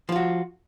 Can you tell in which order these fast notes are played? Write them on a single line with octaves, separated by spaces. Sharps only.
F3 F4 F#4